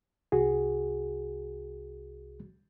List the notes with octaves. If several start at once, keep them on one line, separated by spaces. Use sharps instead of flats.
C2 F#4 G#4